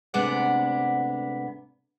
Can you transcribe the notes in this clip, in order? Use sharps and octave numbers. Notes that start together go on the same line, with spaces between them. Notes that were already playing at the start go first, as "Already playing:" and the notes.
D2 C3 G#3 B3 D5 F#5